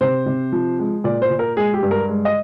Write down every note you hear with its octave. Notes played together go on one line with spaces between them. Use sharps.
C3 C5
C3
F3
G#3
A#2 D5
C5
A#2
A#4
G#3 G#4
G4
G2
A#4
G#3
D#5